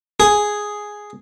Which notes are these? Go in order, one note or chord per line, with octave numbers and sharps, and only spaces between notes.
G#4